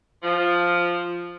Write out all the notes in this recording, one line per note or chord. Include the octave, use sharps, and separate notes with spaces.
F3